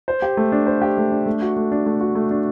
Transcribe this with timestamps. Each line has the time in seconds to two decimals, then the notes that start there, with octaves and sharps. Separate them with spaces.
0.08 C5
0.22 G4
0.37 A3
0.52 D4
0.67 C5
0.82 G4
0.98 A3
1.11 D4
1.26 A3
1.42 F#4
1.57 A3
1.72 D4
1.86 A3
2.01 F#4
2.15 A3
2.31 D4